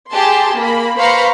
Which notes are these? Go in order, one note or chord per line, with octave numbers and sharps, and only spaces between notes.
G4 G#4 A5 C6
A#3 B5
B4 C5 F5 A#5 B5 C#6